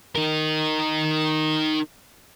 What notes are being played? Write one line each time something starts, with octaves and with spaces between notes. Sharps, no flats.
D#4 A#4